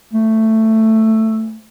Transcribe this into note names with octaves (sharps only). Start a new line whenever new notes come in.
A3